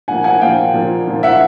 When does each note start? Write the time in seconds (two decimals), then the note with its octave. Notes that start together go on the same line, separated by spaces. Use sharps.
0.08 A#2 F3 A#3 F#5 G#5
0.24 F#5 G#5
0.41 A#2 F3 A#3 F5 G5
0.74 A#2 F3 A#3
1.07 A#2 F3 A#3
1.23 E5 F#5